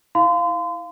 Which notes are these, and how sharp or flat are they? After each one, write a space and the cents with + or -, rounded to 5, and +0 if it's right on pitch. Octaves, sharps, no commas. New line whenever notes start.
E4 -30 F5 +0 C6 -35